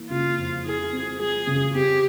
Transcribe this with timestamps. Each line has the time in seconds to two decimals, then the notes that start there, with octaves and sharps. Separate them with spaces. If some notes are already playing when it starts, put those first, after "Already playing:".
Already playing: E3 A#3
0.10 C#3 F4
0.38 F2
0.65 E4 G#4
0.93 C4
1.20 F3 G#4
1.47 C#3
1.74 C4 G4